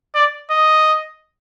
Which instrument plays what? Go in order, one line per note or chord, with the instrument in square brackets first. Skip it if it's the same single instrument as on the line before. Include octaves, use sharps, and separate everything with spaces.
[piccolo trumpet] D5
D#5